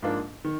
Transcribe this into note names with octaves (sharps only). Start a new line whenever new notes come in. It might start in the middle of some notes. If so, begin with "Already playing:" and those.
G#2 F3 A#3 D4 F4
D#3